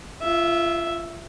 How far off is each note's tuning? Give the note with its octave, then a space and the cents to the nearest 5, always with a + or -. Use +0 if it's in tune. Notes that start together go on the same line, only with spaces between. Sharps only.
F4 -30 E5 +0